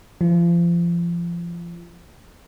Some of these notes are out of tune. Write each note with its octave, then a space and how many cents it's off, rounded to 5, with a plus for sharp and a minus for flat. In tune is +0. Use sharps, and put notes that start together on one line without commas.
F3 -30